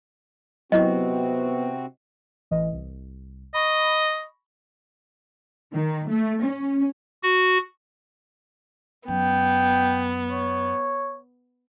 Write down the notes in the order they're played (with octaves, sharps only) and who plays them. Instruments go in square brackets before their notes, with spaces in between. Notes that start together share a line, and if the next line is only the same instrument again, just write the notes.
[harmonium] C3 C4 F#4 [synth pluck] F#3 E4 C#6 [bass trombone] B3 [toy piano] D#5
[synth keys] A1 E3 D#5
C2
[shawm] D#5 [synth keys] B5 C#6 A#6
[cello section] D#3
A3
C#4
[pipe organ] F#4
[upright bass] F#2 [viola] B3 [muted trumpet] G5
[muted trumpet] C#5